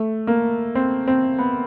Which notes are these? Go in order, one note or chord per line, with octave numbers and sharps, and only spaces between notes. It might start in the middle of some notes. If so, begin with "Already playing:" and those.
Already playing: A3
A#3
C4
C4
B3